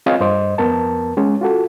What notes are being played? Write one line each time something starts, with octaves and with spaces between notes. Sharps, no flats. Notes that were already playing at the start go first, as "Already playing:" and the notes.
C4 F4 G#4 C#5 D#5 F5
G2 C5 D#5
F2 B3 A#4 A5
G#3 C#4 G#4
F4 F#4 A4